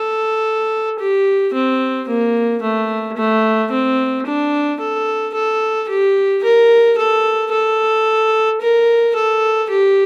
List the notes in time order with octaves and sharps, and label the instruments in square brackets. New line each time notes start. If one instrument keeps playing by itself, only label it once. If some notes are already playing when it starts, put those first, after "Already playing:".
Already playing: [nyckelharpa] A4
G4
C4
A#3
A3
A3
C4
D4
A4
A4
G4
A#4
A4
A4
A#4
A4
G4